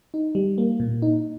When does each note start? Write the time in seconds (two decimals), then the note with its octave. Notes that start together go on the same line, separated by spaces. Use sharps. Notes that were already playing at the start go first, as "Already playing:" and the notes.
0.14 D#4
0.35 G3
0.58 A#3
0.80 A#2
1.02 D#4